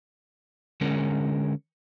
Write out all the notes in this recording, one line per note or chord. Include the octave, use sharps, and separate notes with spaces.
D3 G#3 C#4 A#4